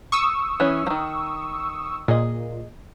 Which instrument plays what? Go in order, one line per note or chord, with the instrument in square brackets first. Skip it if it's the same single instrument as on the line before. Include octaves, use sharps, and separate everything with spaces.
[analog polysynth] C#6 D#6 E6
[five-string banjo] E3 C#4
D#3 F3
[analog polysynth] A#2 [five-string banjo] G#4 D#5